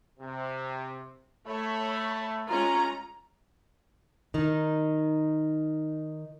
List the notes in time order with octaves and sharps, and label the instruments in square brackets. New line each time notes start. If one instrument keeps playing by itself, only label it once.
[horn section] C3
[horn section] A3 [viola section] C#5 B5
[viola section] G#3 C#4 F4 [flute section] A#5
[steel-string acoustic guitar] D#3 D#4